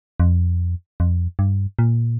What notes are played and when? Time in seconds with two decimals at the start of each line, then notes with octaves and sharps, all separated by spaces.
0.20 F2
1.00 F2
1.39 G2
1.79 A#2